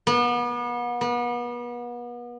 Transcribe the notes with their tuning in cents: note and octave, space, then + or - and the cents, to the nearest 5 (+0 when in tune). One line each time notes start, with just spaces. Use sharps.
B3 -35
B3 -35